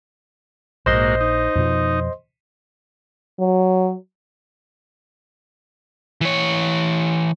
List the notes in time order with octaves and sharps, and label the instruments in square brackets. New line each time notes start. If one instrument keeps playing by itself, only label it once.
[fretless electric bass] A#1 [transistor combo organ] G#2 A#3 F#4 [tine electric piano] C5 D#5 C6
[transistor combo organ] D#4
[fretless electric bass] F2 B2 F3
[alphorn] F#3
[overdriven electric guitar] E3 C#5